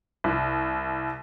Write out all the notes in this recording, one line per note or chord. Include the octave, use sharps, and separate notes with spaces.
C2